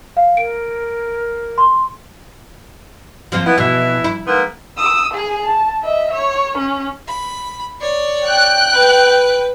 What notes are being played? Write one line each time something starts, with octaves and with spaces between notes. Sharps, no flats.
F5
A#4 D7
C6
F3 A#3 C4
B3 E4
B2 E3 E5
E4
G#2 A#3 B3
D#6 E6
G#4 G#5
A5
D#5 E5
C#5
C#4
B5
C#5 D5
G5 F#6
B4